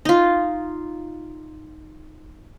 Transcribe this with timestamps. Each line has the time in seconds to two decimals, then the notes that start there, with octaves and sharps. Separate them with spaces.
0.05 D#4 F4